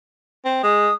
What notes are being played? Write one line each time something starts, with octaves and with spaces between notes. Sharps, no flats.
C4
G#3 D#6